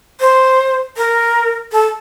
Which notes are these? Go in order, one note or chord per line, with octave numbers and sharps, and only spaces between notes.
C5
A#4
A4